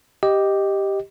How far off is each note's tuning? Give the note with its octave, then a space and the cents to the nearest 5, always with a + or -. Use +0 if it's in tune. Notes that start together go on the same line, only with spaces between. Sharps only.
G4 +0 D#5 +0